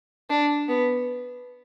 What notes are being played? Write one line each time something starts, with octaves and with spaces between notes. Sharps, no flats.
D4
B3